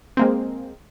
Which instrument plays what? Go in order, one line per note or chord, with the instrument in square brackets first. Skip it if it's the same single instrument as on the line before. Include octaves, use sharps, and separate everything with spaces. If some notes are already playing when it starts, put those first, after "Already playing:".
[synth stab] G#3 A#3 C4